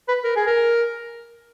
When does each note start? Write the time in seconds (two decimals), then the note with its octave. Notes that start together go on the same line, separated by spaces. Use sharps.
0.08 B4
0.24 A#4
0.36 G#4
0.46 A#4